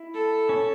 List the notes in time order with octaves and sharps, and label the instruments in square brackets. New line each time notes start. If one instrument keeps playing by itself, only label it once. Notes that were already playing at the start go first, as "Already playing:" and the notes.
Already playing: [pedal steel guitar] E4
[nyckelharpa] A4
[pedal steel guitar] C#4